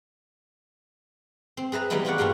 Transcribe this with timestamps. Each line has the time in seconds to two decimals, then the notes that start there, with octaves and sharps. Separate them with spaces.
1.57 C4
1.72 G#4 B4 E5 A#5
1.90 E3 G3 G#3 B3 D#4 E4
2.05 G#3 F4 F#4 B4 D5 F#5
2.18 G2 G3 A#3 F4 F#4